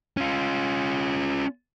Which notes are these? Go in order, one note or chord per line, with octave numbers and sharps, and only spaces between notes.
C#4 F4